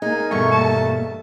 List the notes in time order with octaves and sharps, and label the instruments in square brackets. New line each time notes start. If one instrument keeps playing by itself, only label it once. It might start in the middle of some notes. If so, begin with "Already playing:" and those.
[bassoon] G#3 [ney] A#3 [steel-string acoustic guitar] D#4 [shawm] G#5
[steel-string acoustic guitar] E2 G2 B2 [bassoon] A3 [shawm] C#6
[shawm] A5